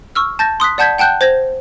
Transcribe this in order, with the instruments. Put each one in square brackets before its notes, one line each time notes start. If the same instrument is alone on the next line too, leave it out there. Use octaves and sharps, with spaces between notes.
[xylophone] C#6 E6 F6
A5 G6 A6 A#6
C6 D#6 F#6 B6
D5 F#5 A5 G6 G#6 B6
F#5 G5 A5 F#6 G6
C5 G#6 A#6